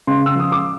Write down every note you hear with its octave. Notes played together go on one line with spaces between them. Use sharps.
C#3 C6
E6
F3 D#6
D6